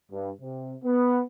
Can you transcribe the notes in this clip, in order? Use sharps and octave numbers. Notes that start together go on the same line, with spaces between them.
G2
C3
B3